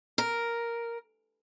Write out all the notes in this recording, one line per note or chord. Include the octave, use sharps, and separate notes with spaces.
A#4